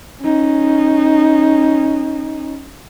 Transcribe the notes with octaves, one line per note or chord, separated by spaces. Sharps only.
C#4 D#4